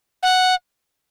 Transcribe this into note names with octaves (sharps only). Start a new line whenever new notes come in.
F#5